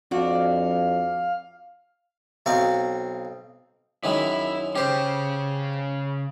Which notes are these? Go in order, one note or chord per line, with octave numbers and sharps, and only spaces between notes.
F2 D4 F#4 F5
B1 C4 F5 C#6
F#2 D#3 G#3 E4
C#3 C#4 G4 C5